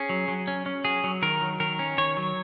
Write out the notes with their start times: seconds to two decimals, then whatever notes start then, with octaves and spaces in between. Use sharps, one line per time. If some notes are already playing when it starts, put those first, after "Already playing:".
Already playing: C#4 G#4
0.09 F#3
0.28 F#3
0.48 C#4
0.66 C#4
0.84 F#3 G#4
1.04 F#3
1.22 D#3 A#4
1.41 F#3
1.60 D#3 A#4
1.79 C#4
1.98 D#3 C#5
2.17 F#3